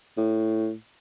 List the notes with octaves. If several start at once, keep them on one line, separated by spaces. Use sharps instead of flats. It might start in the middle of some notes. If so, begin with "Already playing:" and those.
A2